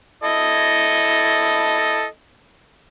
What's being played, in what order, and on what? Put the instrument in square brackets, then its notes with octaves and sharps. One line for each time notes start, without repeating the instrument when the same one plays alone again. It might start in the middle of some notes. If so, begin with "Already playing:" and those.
[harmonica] E4 A4 D#5